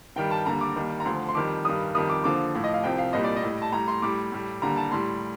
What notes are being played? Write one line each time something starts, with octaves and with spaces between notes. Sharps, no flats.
G2 D#3 G3 G5
A5
D#2 D3 G3 A#5
D6
D#2 D#3 G3
A#5
D2 D3 F3 C6
C6
F2 D#3 G3 D6
G2 D#3 G3 D#6
F2 D#3 G3 D#6
D6
D#2 D3 F3 D6
A2 F3
D#5
F5
C2 C3 F3 G5
F5
C2 A#2 G3 D#5
D5
D#5
A2 G3
A5
A2 G3 A#5
C6
A2 G3 D6
A2 G3
D#2 D3 G3 A#5
A5
A2 G3 C6